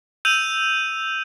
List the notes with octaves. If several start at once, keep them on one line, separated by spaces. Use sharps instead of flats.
E6 G6 D#7 F7